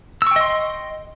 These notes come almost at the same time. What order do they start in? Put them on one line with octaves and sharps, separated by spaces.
E6 C#6 G5 D#5 C6